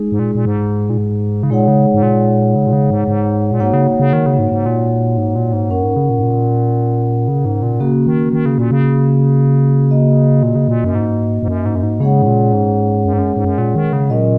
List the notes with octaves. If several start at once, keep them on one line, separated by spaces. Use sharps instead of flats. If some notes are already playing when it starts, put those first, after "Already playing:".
Already playing: G#3 D#4 G#4
G#2
A#2
A#2
G#2
A#2
G#2
C#3
A#2 G#3 D#4 G#4 C#5 F#5
C#3
G#2
A#2
C#3
A#2
C#3
G#2
G#2
A#2
G#2 A#3 D#4 F#4 C#5 F#5
C#3
C#3
D#3
C#3
G#2
G#2
A#2
G#2
A#2
G#2
F#2 C#4 A#4 F#5
G#2
C#3
A#2
G#2
A#2
C#3
G#2
A#2
C#3 A#3 C#4 F#4
D#3
D#3
C#3
A#2
C#3
A#3 F#4 D#5
A#2
C#3
A#2
F#2
G#2
G#2
F#2
G#2
F#2
G#2
C#3 G#3 C#4 G#4 C#5 F#5
G#2
A#2
G#2
F#2
G#2
F#2
G#2
F#2
A#2
D#3
C#3
A#2 F#3 C#4 A#4 D#5